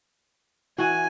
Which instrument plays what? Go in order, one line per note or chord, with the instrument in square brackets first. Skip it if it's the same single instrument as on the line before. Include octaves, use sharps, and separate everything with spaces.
[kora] E3 F#4 [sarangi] G#5